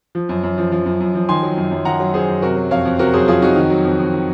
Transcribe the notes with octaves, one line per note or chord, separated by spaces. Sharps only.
F3
F#2
F#2
F3
F3
F#2
F#2
F3
D#3 G#5 C6
F#3
F#2
F#2
D#3 F#5 A#5
F#3
F#2 G#4 C5
F#2
C3 F#4 A#4
F#3
F2 C#5 F5
F2
C3 F#4 A#4
F#3 G#4 C5
F2 F4 G#4
F2 D#4 F#4
D#3
F#3
F2
F2
D#3